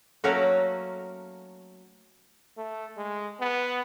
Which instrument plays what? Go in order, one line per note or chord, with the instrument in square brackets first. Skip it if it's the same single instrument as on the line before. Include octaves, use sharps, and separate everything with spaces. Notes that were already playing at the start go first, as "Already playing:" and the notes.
[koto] F#3 A3 A#3 C#4 F#4
[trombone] A3
G#3
B3